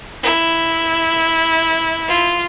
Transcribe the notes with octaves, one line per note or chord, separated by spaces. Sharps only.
E4
F4